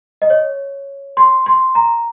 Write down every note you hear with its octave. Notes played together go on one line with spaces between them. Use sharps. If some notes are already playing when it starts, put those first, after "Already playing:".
D#5
C#5
C6
C6
A#5